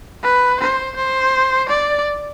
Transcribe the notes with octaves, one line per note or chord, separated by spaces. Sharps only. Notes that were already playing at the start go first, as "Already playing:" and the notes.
B4
C5
C5
D5